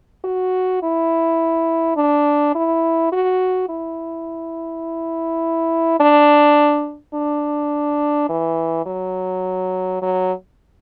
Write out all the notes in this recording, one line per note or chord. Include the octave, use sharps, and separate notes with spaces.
F#4
E4
D4
E4
F#4
E4
D4
D4
E3
F#3
F#3